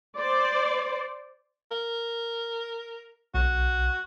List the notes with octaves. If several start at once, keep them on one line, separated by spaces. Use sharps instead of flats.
C5 D5
A#4
B1 F#4